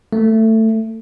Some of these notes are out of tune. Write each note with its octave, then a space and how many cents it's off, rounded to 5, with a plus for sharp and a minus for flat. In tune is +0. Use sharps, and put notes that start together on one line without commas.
A3 +15